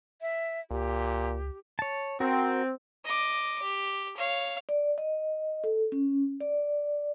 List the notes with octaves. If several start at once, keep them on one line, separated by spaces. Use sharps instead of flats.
E5
C#2 A#2 G4
C#5 A5
C4 F#4 A#4
D#5 D6
G4
C#5 F5
D5
D#5
A4
C#4
D5